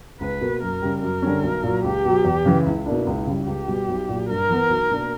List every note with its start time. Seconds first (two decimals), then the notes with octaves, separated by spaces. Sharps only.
0.20 C#2 B4
0.41 B2 A#3
0.62 F#2 A#4
0.82 C#3 G3
1.02 F#2 A#4
1.22 D3 G3 C#4
1.43 B1
1.63 A#2 F#3
1.84 C#2 G4
2.05 B2 F#3
2.25 E2
2.45 C#3 E3
2.66 C#2 E4
2.86 B2 A#3 D4
3.07 C#2
3.27 C#3 G3
3.47 C#2 G4
3.68 B2 G3
3.88 B1
4.09 A#2 F#3
4.29 G2 A#4
4.49 E3 B3
4.70 B1
4.90 B2 A#3 D4